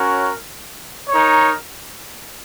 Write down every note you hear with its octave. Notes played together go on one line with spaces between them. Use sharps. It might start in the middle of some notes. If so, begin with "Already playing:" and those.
Already playing: C#4 F#4 A#4 C#5
D#4 A#4 C#5